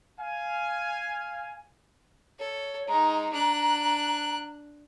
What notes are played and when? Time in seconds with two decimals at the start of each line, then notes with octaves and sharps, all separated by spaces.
0.21 F5 G#5
2.39 A4 C#5
2.87 G#3 D#4 A#5
3.33 D4 F#6